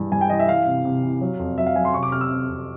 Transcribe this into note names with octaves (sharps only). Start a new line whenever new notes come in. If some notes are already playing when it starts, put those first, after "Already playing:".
Already playing: G2 E3 G#3
G2 G#5
G5
E3 D#5
E5
E3 F5
C3
C3
E3
F#3
F2
F#3 E5
F5
F#3 G#5
C6
C3 C#6
D6
C3 F6
E6
C3
F2